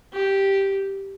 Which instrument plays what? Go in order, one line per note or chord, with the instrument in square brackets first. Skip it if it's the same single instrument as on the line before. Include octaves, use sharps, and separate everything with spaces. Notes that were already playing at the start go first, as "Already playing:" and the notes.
[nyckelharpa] G4